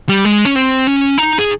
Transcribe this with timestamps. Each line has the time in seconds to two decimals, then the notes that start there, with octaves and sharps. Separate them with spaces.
0.09 G3
0.25 G#3
0.45 C#4
0.56 C4
0.87 C#4
1.18 D#4
1.39 G#4